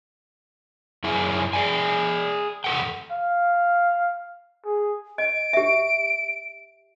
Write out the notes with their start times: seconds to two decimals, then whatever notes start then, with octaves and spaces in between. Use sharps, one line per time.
1.04 F#2 E4 G#4
1.53 G#4 A#4 D5 G5 G#5
2.64 E2 A4 F#5 G5
3.11 F5
4.65 G#4
5.18 D#5 D7
5.53 G4 E5